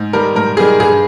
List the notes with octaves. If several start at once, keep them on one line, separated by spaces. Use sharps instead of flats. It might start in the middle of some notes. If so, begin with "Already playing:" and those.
Already playing: G#2
D#3 G3 A#4
G#2 A#4
D#3 G3 G#4
G2 G#4